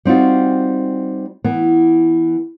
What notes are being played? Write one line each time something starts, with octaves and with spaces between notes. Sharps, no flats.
G3 C4 D#4 F4 F#4
E3 B3